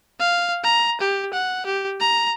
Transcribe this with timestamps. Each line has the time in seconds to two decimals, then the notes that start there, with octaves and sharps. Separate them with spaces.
0.20 F5
0.63 A#5
1.01 G4
1.33 F#5
1.66 G4
2.00 A#5